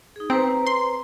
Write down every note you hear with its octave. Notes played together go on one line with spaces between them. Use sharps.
D#4 G#4
C4 B4 C5 A#5
C6